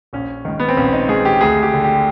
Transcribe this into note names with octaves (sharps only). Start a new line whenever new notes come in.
A#1 C#4
G#2 D#3
B3
C4
A#1 C#4
D#4
G#2 D#3 G#4
G4
D2 G#4
G4
D3
G4